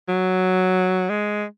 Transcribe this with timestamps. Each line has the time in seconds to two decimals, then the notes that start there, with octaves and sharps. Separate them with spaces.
0.08 F#3
1.09 G#3